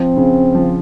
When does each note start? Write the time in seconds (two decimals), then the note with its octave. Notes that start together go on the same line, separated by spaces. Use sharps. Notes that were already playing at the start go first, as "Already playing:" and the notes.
Already playing: F3 C4
0.17 C#3
0.55 F3